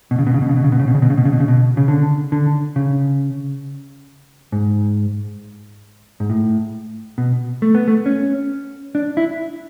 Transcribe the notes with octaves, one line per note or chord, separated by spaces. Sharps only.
B2
C#3
B2
C#3
B2
C#3
B2
C#3
B2
C#3
B2
C#3
B2
C#3
B2
C#3
B2
C#3
B2
C#3
D3
D3
C#3
G#2
G#2
A2
B2
A3
B3
A3
C#4
D4
E4